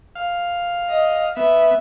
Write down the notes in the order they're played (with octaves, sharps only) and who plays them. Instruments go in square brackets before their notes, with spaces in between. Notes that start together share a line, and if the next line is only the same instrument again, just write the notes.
[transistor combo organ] F5
[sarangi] D#5
[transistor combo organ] B3 [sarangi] E5